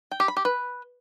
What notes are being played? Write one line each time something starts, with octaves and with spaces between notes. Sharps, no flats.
G5
G4
B5
G4
B4